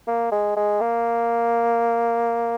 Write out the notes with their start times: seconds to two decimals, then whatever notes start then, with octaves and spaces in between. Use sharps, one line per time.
0.08 A#3
0.32 G#3
0.56 G#3
0.81 A#3